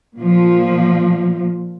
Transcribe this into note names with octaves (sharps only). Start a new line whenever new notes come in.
A#2 F3